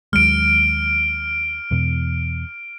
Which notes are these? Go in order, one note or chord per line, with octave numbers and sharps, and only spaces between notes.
D#2 F#3 G#3 F6 D7
E2 B2